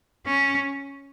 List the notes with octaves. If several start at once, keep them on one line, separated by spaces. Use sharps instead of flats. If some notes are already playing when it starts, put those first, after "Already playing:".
C#4